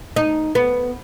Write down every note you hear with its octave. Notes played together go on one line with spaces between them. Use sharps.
D#4
B3